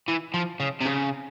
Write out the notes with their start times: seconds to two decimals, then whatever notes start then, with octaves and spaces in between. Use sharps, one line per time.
0.08 E3
0.34 F3
0.60 C#3
0.80 C3
0.85 C#3